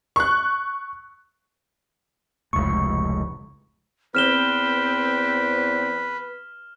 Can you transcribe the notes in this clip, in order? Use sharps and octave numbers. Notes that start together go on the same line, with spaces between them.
C#6 F#6
F1 C#2 A2 C#6
E2 C4 B4 F6 E7 G7